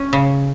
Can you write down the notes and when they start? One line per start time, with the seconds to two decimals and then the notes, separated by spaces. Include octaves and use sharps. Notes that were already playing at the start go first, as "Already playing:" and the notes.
Already playing: C#4
0.13 C#3